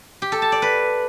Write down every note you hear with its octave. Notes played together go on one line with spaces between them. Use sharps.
G4
A4
A5
D5
B4